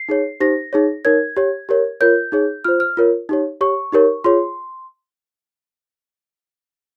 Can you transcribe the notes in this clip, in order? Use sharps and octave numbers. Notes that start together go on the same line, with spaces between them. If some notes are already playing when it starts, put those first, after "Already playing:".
Already playing: C7
D#4 G#4 C#5
D#4 G4 C5 A#6
D#4 G#4 C#5
D#4 A#4 C#5 G#6
G4 C#5
G4 A#4 C#5
F4 A#4 C#5 G6
D#4 G#4 C#5
F4 C5 F6
F6
F4 A#4 C#5
D#4 G4 C#5
G4 C#5 C#6
D#4 G4 A#4 C#5
F4 G#4 C#5 C6